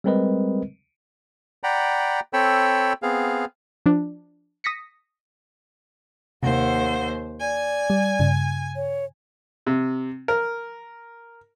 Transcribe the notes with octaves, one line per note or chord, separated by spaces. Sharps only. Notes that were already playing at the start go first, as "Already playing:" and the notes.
G3 G#3 C4 A#4 B4 D#5
D5 F#5 G5 A#5 B5
C4 A4 C#5 G5 B5 E6
B3 C4 G#4 F5
F3 D4
D#6 A#6 B6 C#7
D#2 C3 C5 F#5
D5 G#5
G3
G2 C#3
C#5
C3
A#4